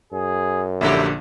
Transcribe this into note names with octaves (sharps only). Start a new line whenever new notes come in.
F#2 G#4
A#1 G#2 D3 A3 E4 G4